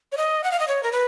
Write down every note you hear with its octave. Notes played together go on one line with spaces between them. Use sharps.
C#5
D#5
F#5
F5
D#5
C#5
A#4
B4